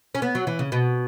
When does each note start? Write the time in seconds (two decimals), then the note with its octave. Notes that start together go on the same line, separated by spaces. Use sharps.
0.15 C#4
0.22 B3
0.35 F#3
0.47 E3
0.59 C#3
0.72 B2